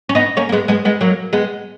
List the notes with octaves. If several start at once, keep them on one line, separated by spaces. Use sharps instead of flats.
C#4
B3 D#4
A#3 C#4
A#3
G#3 B3
G#3 B3
G#3 B3
F#3 A#3
G#3 B3